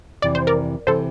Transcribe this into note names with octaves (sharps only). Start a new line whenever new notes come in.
F2 C3 E3 D5
C5
A#4 D5
C3 E3 A4 C5